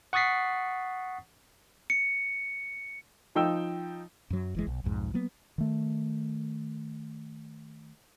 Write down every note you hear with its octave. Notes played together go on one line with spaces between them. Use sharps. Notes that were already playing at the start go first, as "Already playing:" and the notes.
F#5 C#6 D#6 A6 B6 C7
C#7
F3 D#4 G5 E6
F#2 F#3
F#1 E3 G#3
B1
B1 F2 G#2
F#3 A#3 B3
D#3 A3